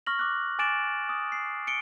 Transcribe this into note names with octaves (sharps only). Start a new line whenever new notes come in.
C#6 F6 A#6 F#7
D6 F#6
G#5 D6 A6 D7 E7 F#7
D#6
C7
C#7 D7 G7